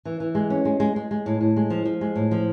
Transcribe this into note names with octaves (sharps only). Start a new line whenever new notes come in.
E3
E3
G#3
C#4
G#3
G#3
G#3
G#3
A2
A2
G#3
F3
F3
G#3
A2
F3